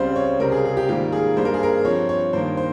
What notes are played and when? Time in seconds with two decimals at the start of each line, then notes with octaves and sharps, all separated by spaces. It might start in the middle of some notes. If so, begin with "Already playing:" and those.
Already playing: C#2 C#3 G3 C4 C5
0.16 C#5
0.40 C#2 C3 G3 C4 A#4
0.52 G#4
0.65 G#4
0.77 G4
0.89 G#2 D#3 G3 A#3 F4
1.12 G#4
1.36 G2 G3 A#3 C5
1.45 A#4
1.54 G#4
1.63 A#4
1.84 G2 F3 C4 C#5
2.09 C#5
2.33 G2 D#3 A#3 C5
2.57 C5